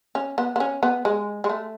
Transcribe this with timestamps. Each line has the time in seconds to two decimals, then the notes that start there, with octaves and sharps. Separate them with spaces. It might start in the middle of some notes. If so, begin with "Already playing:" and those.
0.15 C#4
0.38 B3
0.56 B3
0.60 C#4
0.83 B3
1.05 G#3
1.44 G#3
1.50 A3